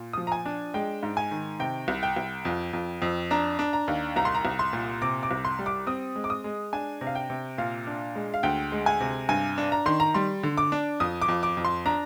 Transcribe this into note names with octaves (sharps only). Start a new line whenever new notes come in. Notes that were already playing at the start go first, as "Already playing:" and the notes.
Already playing: A#2
F3 D#6
A#5
G#5
D4
G#3 G5
G#2
G#5
D#3
C3 G5
C2
G5
C2
F2
F2
F2
D4 A#5
D4
A#5
D#2
C2 A#5
C6
A#5
C2
C6
A#2
C3 D6
D6
C2
C6
G3
D6
C4 D#6
G#3
D6
D#6
G#3
D4 G#5
C3
F5
G5
C3
A#2 F5
D4
G#3
F5
D2 G5
G#3
G#5
C3
G2 G#5
D4
A#5
D#3 C6
A#5
G3 C6
D3
D6
D4
F2 D#6
D6
F2
D6
F2
C6
D4 A#5